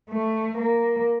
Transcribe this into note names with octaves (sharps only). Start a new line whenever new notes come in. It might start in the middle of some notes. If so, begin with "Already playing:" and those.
A3
A#3